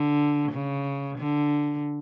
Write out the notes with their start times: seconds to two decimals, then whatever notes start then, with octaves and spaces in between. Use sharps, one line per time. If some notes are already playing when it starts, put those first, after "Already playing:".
Already playing: D3
0.52 C#3
1.18 D3